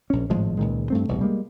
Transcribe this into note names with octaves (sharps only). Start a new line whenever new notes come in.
A#1 C#4
G#1 A2 F3 G#3
C#2 A#2 D#3 G#3
G2 A3 C4
E1 C2 B2
G3 G#3 A#3